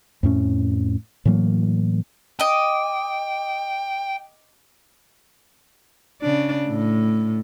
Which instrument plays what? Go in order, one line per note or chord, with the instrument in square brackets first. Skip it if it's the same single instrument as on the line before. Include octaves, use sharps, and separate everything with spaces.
[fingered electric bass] F2 A2 C#4
A2 E3 F#3 A#3
[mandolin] D#5 D6 [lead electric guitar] G5
[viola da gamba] C#3 D4
A2